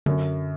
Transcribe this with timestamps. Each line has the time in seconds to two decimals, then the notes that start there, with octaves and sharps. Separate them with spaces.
0.06 F#2 D3